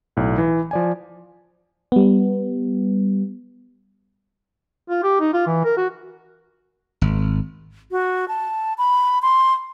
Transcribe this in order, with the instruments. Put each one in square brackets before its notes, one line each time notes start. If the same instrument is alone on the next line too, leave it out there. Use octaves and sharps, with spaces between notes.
[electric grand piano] B1 A2
E3
F3 D5 G#5
[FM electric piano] G3 B3
[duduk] F4
G4
D#4
F4
E3
A#4
F#4
[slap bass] G#1
[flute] F#4
A5
B5
C6